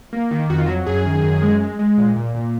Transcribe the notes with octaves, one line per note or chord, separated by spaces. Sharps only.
A#3
D#3
F2 F#4
F4
F#3 F#4
F#2 G#4
D#3
F#2
G#3
G#3
G#3
A#2
A#2
A#2